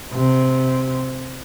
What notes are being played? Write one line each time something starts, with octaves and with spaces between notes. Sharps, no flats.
C3